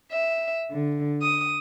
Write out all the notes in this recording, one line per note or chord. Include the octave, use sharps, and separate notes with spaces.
E5
D3
D#6